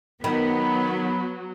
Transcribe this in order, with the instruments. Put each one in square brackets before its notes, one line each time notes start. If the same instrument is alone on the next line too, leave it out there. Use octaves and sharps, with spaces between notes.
[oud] D#3 [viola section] F#3 [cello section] B3 [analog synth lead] B5